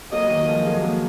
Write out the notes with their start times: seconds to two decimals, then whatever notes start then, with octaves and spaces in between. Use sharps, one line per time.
0.12 F#3 A#3 D#5
0.30 D#3 F#3
0.48 F3 G#3
0.66 F#3 A#3
0.84 F#3 A#3